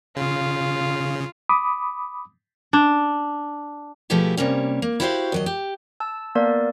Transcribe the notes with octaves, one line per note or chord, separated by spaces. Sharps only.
C#3 F4
B5 D6 D#6
D4
B2 F3 A3 E4 G4 G#4
C3 G3 A#3 C#4
A#3
E4 F#4 G4 C5 D5 F5
D#2 F#3 D#5
G4
A5 E6
A#3 B3 A#4 D5